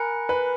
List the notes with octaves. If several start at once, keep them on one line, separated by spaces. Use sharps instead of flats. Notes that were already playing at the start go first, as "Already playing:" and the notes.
Already playing: A#4 G#5 B5 F#6 C#7
B4